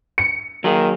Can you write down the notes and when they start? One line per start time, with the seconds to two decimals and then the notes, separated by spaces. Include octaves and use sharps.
0.18 C#7
0.64 D#3 F#3 A#3 G#4